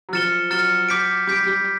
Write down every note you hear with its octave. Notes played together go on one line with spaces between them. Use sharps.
F#3
F3 F6 A6 C#7 E7 G7
F#3 F6 A6 C#7 E7 G7
D6 G6 B6 D7
G3 D6 G6 B6 D7
G3